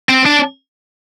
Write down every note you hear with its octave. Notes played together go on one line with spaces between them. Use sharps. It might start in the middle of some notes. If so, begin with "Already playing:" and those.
C4
D4